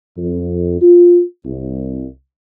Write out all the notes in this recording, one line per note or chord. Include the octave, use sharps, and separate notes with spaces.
F2
F4
C2